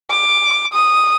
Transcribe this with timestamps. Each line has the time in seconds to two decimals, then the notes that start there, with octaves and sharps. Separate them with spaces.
0.10 D6
0.72 D#6